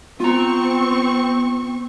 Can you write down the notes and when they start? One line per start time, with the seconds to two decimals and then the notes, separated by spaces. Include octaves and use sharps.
0.20 B3 C4 F4 A#5 C#6